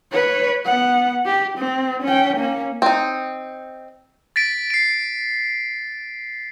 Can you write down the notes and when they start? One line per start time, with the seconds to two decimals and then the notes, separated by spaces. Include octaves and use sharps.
0.12 B4 C#5
0.65 B3 F#5
1.26 G4
1.58 C4
2.03 C#4 G5
2.37 A#3 C#4
2.82 C4 D#4
4.36 A6 B6 D7
4.70 C7 D7